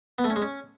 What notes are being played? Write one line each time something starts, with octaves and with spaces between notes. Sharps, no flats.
B3
A3
C#4
G#3
C#4